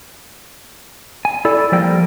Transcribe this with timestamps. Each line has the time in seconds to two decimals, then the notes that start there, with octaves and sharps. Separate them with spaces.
1.25 G#5
1.45 E4 A4 D5
1.72 F3 G3 A#3 G5